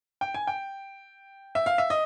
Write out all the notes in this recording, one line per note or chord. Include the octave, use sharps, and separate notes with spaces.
G5
G#5
G5
E5
F5
E5
D#5